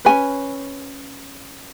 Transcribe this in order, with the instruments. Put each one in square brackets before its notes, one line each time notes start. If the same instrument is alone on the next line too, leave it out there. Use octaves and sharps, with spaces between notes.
[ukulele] C#4 F#4 B4 G#5